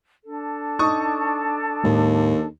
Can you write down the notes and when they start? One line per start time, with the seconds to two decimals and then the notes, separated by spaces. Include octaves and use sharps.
0.24 D4 A4
0.79 D#4 C#6 D#6
1.84 D#2 A2 G#3